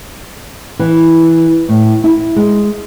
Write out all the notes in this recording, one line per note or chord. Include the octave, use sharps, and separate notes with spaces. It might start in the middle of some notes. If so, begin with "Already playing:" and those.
E3
A2
E4
G#3